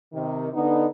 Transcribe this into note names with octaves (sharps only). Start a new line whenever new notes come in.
C3 D#3
D3 B3 D#4